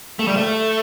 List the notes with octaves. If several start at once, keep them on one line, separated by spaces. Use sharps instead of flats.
A3
G3
A3